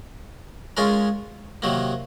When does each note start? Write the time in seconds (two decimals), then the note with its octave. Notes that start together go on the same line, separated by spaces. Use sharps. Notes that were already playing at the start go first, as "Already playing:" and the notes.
0.77 G#3 C#4 F4 A#4
1.62 C3 D#3 F#3 A#3